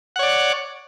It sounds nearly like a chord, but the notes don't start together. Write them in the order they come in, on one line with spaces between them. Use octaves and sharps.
F#5 C#5 D5